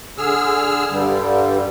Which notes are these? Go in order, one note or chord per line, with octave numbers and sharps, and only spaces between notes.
D3 G#4 E6 F6
G2 D3 G3